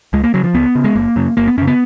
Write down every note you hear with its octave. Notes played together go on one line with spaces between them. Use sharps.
C#2 G#3
A#3
C#3 F#3
F3
C#2 B3
C#3
G#3
F#1 A#3
F#2 C#3
F#1 A#3
B3
F#2 C#3 C#4
B3